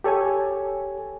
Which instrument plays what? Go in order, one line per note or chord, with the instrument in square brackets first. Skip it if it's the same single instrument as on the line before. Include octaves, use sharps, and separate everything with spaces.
[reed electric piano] G4 A4 C#5 G#5